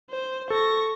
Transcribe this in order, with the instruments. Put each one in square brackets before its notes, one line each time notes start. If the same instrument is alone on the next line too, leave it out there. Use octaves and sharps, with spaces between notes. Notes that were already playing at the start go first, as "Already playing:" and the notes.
[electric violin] C5
[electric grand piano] A4 [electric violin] C#6 A#6